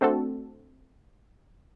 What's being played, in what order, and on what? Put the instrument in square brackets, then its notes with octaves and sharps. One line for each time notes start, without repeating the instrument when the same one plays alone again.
[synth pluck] A3 C4 D4 F#4 A4